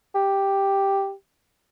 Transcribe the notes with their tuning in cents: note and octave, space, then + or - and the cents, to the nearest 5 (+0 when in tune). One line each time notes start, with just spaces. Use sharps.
G4 +0